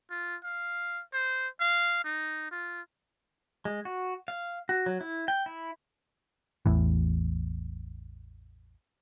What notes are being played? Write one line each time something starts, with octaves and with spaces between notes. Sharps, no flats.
F4
F5
C5
F5
D#4
F4
G#3
F#4
F5
F#4
F#3
E4
G5
E4
A1 E2 A2 E3